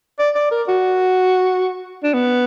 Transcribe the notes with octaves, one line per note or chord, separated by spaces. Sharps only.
D5
D5
A#4
F#4
D4
B3